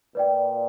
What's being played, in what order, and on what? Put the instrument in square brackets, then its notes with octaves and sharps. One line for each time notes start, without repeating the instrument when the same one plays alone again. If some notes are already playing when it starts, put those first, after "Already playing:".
[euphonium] A#2 [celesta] B4 D5 G5